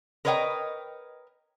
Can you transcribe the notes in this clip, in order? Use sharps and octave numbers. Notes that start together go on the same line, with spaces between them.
A#4 B4 C#5 D#5 F5 G5